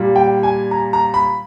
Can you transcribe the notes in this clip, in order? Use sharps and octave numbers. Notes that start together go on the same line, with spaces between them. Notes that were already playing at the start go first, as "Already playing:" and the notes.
Already playing: A#2 G3
G5
G#5
A#5
A#5
B5